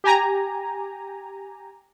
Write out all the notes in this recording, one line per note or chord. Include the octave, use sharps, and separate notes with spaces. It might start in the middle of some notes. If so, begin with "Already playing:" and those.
G4 G#5 A#5